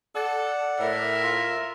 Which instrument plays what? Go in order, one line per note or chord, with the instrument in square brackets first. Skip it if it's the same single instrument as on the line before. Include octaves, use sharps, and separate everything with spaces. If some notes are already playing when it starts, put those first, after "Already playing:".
[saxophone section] A4 [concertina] D5 F#5
[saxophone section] A2 [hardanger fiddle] A#4 [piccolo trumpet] E5
[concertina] F4